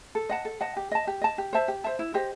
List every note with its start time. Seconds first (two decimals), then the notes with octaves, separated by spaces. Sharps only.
0.15 A4
0.29 D#5 F#5 A5
0.45 A4
0.61 D#5 F#5 A5
0.77 G4
0.91 D#5 A5
1.07 G4
1.21 D#5 A5
1.38 G4
1.53 C5 E5 A5
1.68 G4
1.84 C5 E5 A5
1.99 E4
2.14 G4 C5 D#5